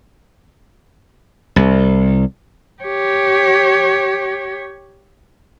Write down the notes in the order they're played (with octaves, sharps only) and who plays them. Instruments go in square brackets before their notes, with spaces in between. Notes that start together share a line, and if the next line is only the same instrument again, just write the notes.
[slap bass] C2
[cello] G4 C#5